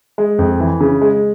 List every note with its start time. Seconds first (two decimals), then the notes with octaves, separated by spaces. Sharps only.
0.18 G#3
0.39 F2
0.60 E3
0.81 C#3
1.01 G#3